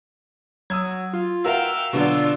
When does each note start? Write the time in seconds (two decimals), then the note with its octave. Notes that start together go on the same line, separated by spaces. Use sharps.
0.70 F#3 D#6 E6 G#6
1.13 F4
1.45 F#4 A#4 E5 F5 G5 E6
1.93 B2 D3 F#3 D4 F4